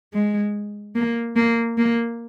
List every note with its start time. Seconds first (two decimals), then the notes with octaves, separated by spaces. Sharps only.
0.13 G#3
0.95 A#3
1.36 A#3
1.78 A#3